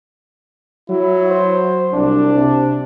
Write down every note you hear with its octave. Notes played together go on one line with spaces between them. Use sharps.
F#3 E4
C5
C2 D4
C3